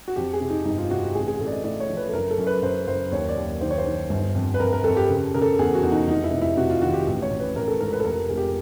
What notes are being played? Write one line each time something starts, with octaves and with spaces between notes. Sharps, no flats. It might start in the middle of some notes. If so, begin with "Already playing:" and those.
F#4
F2 G4
G#4
C3
D#4
G1 D#4
F4
C3 F#4
G4
A1 G#4
G#4
A1 A4
D5
D#5
A2 D5
C#5
F3
B4
A4
F#1 A#4
A4
F#2
B4
F#2 C5
F#1 C5
D#2 C#5
D5
D#2
D#3 C5
C#5
C5
D#3
G1
F2
B4
F2 A#4
A#4
F2 A4
G4
C#3
C#3 A#4
A4
E2 G#4
F#4
E2
D#4
F1 D#4
E4
C3
E4
C3 F#4
F4
D#3 F#4
G4
A1
C#5
A1
B4
A1 A#4
A4
G#2 A#4
B4
A4
F1 A#4
F1 G#4
G4